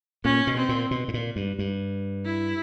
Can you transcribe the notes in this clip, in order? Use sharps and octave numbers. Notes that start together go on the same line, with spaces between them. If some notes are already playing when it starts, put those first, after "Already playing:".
A#2 C#4
B2
C4
A#2
B2
A2
A#2
G2
G2
E4